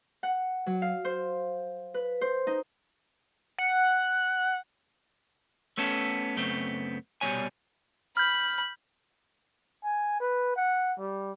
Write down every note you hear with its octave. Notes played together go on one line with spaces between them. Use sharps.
F#5
F#3
F5
C5
B4
C5
D#4
F#5
A3 B3 C#4 A4
F#2 C#3 A3 B3 C4
C2 B2 G3 G#3 C#5 G#5
B5 F6 G6
G#5
B4
F#5
G3